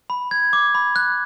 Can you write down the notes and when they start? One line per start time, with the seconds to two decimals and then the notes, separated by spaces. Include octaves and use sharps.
0.10 B5
0.31 G#6
0.53 D6
0.75 B5
0.96 F#6